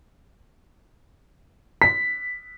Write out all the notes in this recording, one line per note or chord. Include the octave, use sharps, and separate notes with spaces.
B6